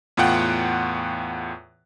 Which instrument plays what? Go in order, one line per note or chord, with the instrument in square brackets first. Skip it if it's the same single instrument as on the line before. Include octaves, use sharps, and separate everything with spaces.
[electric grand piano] E2 A2 F4 F#5 G5 F#6